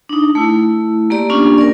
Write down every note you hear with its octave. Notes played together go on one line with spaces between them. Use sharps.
D4 D#4
A3 E4
A#3 G4 D5
A#3 C#4 D4 F4 G4
A#4 D5